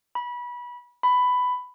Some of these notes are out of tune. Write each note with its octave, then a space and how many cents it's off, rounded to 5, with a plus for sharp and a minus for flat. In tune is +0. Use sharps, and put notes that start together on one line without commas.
B5 -25
B5 +10